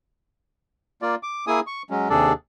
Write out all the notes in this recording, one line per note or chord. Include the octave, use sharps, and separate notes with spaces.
A#3 F4 D5
D6
A#3 E4 G#4 G#5 D#6
C#6
F#3 G#3 C#4
D#2 C3 D4 G#4 A4 D5